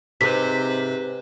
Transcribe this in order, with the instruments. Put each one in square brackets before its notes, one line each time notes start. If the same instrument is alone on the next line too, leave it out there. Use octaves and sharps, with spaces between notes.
[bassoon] G#2 [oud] C3 [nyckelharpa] B4 C5 [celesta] B6